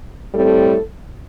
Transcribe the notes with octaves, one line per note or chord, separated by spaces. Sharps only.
A2 G3 C4 A4